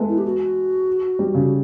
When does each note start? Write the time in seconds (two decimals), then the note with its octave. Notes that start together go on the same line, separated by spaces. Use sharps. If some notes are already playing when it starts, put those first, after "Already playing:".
Already playing: G#3 A3 B3
0.09 E4
0.18 G4
0.25 F#4
1.19 G3
1.35 C#3